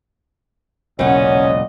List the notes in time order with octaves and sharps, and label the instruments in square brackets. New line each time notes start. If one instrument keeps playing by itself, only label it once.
[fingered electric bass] E1 B1 [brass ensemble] A#2 D#5 [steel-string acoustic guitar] C#3 F#5 [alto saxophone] C#4